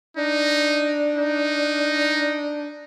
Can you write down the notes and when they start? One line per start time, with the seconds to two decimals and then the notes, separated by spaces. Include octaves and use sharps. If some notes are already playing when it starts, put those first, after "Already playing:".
0.17 D4 D#4
1.16 D#4